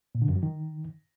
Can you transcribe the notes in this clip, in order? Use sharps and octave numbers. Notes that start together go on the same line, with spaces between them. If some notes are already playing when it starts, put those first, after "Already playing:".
A#2
D3
F#2
F#3
D#3